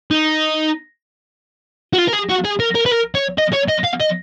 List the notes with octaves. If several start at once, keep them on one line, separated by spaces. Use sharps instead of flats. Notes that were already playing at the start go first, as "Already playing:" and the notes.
D#4
F#4
F4
A#4
G#4
F#4
G#4
A#4
A#4
B4
A#4
C#5
D#5
C#5
D#5
F5
D#5